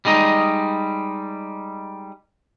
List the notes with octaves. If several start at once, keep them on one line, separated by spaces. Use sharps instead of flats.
G3 G#3 D#4 D#5